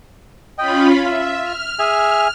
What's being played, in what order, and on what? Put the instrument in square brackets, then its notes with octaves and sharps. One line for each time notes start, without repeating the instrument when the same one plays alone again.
[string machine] C#4 F4 B5 [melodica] D#5 G5
[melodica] F4 [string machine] E5
[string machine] F6
[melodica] G#4 E5 G#5